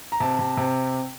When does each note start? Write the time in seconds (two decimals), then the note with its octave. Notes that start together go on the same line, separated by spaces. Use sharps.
0.12 A#5
0.20 C3 A5
0.39 C3
0.57 C3